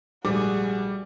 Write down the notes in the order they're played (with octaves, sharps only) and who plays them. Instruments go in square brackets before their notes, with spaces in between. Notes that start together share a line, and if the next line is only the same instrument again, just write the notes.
[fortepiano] A#1 G#2 A3 [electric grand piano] G3 [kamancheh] F#4 G#4 [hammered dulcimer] D5